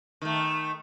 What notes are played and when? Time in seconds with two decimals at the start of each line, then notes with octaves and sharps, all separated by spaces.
0.22 D#3 A3